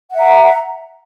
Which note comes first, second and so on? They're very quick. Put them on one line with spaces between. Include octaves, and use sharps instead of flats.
F#5 E5 A#5